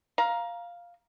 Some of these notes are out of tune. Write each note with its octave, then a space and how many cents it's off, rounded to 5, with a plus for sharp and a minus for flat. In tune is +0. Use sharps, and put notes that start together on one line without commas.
F5 +0 A#5 +15